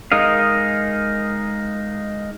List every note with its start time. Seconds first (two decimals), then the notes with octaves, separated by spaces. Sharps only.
0.12 G#3 D#4 A#4 D#5 F5